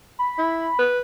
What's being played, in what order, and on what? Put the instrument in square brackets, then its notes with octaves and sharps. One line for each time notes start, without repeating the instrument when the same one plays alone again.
[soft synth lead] B5
[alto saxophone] E4
B4